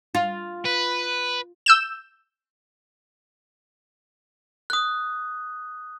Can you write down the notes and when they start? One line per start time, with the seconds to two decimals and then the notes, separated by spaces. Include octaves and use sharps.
0.15 F4
0.65 B4
1.66 E6 G6 E7
4.70 D#6 F#6